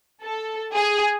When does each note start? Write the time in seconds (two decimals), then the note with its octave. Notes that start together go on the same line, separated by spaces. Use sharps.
0.23 A4
0.75 G#4